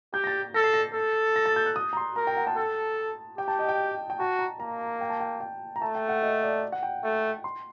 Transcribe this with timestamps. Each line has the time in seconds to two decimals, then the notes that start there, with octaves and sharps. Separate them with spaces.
0.14 G4 G6
0.24 A#6
0.27 A6
0.54 A4 A#6
0.64 C7
0.74 A#6
0.94 A4
1.36 A#6
1.46 A6
1.56 G6
1.66 F#6
1.76 D#6
1.93 A#5
1.97 C6
2.16 A#4 A#5
2.27 G5
2.37 F#5
2.47 A5
2.57 A4
3.38 G4 G5
3.48 A5
3.59 D#5
3.69 G5
4.10 G5
4.19 F#4 A5
4.39 A#5
4.60 A#3 A#5
5.01 G5
5.10 A5
5.20 G5
5.40 G5
5.76 A#5
5.81 A3 A5
5.95 G5
6.09 F#5
6.22 D#5
6.42 D5
6.72 F#5
6.83 G5
7.03 A3
7.44 C6